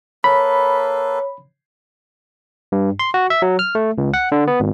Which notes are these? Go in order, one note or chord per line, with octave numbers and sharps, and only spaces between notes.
A#3 A4 B4 C#5 B5
G2
C6
F#4
E5
F#3
F6
A3
C#2
F#5
D3
B3
G#1